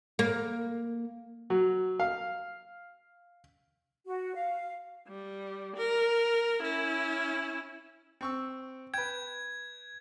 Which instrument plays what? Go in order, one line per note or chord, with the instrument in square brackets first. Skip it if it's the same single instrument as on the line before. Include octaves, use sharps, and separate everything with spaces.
[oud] A#3
[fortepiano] F#3
F5
[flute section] F#4
F5
[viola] G3
A#4
C#4 E4
[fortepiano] C4 C#6 E6
[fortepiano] B4 G5 [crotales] G#6